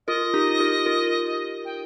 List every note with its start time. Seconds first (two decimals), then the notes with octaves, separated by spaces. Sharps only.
0.07 F4 A#4 D#5
0.34 D#4 G4
0.60 F4 A#4
0.86 F4 A#4
1.65 G5